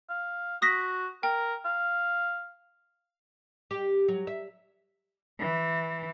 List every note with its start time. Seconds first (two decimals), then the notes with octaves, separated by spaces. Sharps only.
0.09 F5
0.62 F#4 D#6 A#6 B6
1.23 A#4 G5
1.65 F5
3.71 G4
4.08 F#3
4.27 E5
5.39 E3